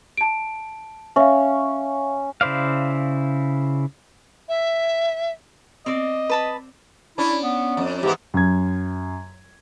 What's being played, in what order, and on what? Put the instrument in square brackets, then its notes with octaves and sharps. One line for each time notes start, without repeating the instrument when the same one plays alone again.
[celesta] A5 D7
[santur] C#4 [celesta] E5 F5
[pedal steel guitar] C#3 E4 C5 D5 F5
[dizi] E5
[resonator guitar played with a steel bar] C4 D5 [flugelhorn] D#5
[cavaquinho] B4 A5 B5
[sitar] C#4 D4 [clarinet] E4
[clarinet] B3
[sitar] F2
[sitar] G#2 E3 B3 [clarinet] G4
[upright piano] F#2 G#6